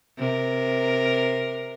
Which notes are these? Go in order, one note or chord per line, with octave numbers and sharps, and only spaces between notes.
C3 A#4